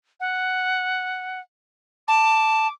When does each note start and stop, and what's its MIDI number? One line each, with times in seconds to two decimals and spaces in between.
0.20 1.40 78
2.08 2.68 81
2.08 2.72 86